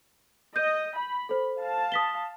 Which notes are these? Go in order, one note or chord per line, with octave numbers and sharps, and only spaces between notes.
D#5 G6 D#7
B5
A4 C5
F5 A5
D#6 B6 G7